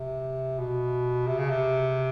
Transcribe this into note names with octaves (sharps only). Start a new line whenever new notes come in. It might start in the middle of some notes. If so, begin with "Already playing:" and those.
Already playing: C3
B2
C3
C#3
C3